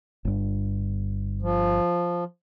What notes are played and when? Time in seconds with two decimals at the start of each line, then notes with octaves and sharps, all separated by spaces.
0.25 G1 G2
1.42 F3